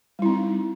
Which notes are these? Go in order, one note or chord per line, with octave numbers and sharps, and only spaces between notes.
G3 C4 D#4 E4